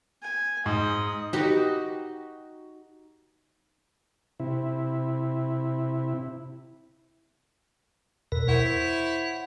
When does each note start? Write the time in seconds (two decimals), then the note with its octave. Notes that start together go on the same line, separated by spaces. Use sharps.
0.22 G#5
0.66 G#2 D#5
1.33 D#4 F#4 G4 B4
4.40 C3 E4
8.32 E2 B2 A#4
8.48 E4 C5 C#5 F#5